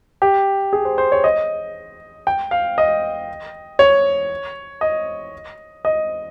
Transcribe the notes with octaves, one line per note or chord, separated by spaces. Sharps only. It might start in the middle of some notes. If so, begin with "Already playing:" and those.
G4
G#4
C5
C5
C#5
D#5
G5
F5
D#5
C#5
D#5
D#5